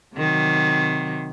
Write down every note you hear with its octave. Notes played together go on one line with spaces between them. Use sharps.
C3 D#3 F#3